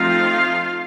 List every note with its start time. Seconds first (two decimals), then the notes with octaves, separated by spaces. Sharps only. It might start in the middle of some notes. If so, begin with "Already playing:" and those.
Already playing: F3 A3 C4 D#4 F4 F5